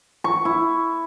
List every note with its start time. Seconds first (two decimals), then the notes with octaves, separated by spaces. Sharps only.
0.24 C#6
0.45 E4